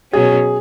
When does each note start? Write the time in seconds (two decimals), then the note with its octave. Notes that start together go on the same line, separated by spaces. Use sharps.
0.13 B2 F#3 C#4 G#4